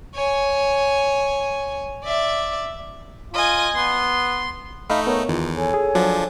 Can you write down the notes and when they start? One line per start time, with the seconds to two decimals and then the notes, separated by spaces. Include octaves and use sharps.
0.15 C#5 G#5
2.04 D5 E5
3.34 F4 D#5 G#5
3.76 B3 C6
4.90 A3 D#4 D#5 F5 B5
5.07 B3 A#4 C#5
5.29 E2 D#3 F4
5.57 A4 C#5 G#5
5.74 G#4
5.95 F3 F#3 D4